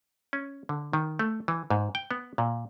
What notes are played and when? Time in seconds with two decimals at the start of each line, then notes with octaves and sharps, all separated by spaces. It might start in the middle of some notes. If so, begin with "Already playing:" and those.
0.33 C#4
0.69 D3
0.93 D#3
1.19 A3
1.48 E3
1.70 G#2
1.95 G5
2.11 B3
2.38 A#2